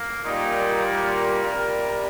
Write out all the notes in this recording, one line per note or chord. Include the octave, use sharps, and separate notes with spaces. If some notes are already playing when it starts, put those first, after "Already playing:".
Already playing: A#3
A#2 G3 D#4
A#4
C3 G3